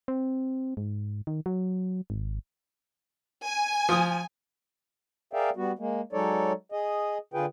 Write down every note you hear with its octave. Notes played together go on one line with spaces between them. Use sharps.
C4
G#2
D#3
F#3
G#1
G#5
F3 D#6
G#4 A#4 D5 E5 F5 G5
G3 B3 F#4
G#3 A#3
F#3 G#3 D#4 A4 C#5 D5
G#4 D#5
D3 F4 G#4 B4 G5